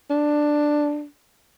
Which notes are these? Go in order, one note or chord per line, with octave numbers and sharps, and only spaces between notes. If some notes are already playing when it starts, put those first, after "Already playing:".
D4